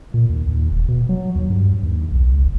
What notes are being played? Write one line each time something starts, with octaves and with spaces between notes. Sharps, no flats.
A#2
D#2
D#2
E1
B2
F#3
D#2
G2
D#2
B1
C#2
F#1